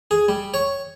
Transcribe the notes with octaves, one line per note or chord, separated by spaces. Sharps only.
G#4
G3
C#5